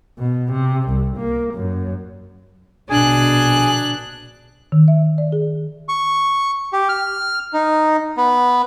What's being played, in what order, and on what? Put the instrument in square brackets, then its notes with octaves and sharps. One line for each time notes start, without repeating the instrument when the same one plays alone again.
[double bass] B2
C3
C2
A#3
F#2
[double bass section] A#1 B2 D3 [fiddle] D4 F#6 [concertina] G#4 G#5
[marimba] D#3
E5
D5
G#4
[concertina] C#6
G4
F6
D#4
B3